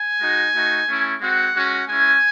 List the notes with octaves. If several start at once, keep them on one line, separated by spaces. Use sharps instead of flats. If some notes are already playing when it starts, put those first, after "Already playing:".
Already playing: G#5
G#3 D#4 F#4
A3 D#4 F#4
A3 C#4 E4
G#3 C4 F#4 F#5
G#3 C#4 F#4
G#3 C#4 E4 G#5